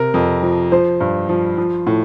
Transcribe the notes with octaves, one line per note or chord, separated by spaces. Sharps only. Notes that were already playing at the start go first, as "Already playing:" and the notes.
Already playing: C3 A#4
F2
F3
F3 C5
G2
F3
F3
A2